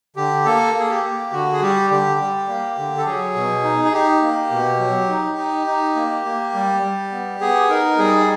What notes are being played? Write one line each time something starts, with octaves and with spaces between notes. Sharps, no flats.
D3 G4
A#3 A4
A#3
G#4
G4
A#3
D3 F#4
G#4
G3 G4
D3 G4
G3
A#3
D3
A4
F#3 G#4
B2
D#4
G#4
D#4 G4
A#3
B2
F#3
D#4
D#4
D#4
A#3
A#3
G3
G3
B3
B3 G#4
D#4 A#4
G3 G#4